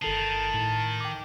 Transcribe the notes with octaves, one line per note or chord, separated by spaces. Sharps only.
G1 D#3 A4 A5 C7
A2
G5 D6